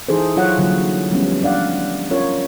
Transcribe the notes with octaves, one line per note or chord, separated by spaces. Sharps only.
E3 D#4 E4 G#4 A4 C5
F#3 E4 F4 C#5 F#5
D3 E3 F#3 G3 A#3 F4
F3 G3 A3 B3 C#4
D4 D5 F5 F#5
C#4 F4 A#4 C#5